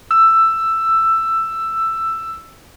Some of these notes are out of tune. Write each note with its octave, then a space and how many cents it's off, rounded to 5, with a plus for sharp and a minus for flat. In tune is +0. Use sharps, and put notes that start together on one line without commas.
E6 +10